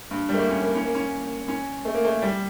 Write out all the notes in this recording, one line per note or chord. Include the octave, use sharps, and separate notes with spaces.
G2
G3
A3
A#3
C#4
A#3
C#4
A#3
C#4
C#4
A3
A#3
A3
G3